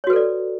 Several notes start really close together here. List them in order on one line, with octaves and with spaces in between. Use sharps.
C#5 F#4 B4 A4 D5